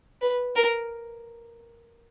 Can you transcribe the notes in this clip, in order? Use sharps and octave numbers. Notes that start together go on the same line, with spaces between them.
B4
A#4